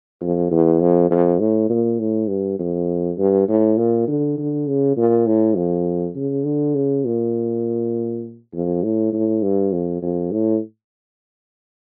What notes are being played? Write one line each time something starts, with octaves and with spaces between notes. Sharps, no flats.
F2
E2
F2
F2
A2
A#2
A2
G2
F2
G2
A2
A#2
D3
D3
C#3
A#2
A2
F2
C#3
D3
C#3
A#2
F2
A2
A2
G2
F2
F2
A2